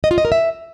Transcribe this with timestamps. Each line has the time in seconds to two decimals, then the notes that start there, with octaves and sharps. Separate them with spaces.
0.04 D#5
0.11 F4
0.18 D#5
0.25 A#4
0.32 E5